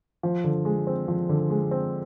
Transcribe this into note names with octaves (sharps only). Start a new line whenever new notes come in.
F3
D3
G#3
C4
F3
D3
G#3
C4